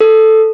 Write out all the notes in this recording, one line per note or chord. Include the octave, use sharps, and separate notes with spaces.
A4